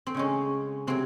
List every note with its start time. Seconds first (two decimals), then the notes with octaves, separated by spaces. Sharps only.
0.06 C4
0.14 C#3 G#3 C#4
0.87 C3 F#3 C4